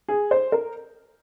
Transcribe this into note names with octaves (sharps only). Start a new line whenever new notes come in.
G#4
C5
A#4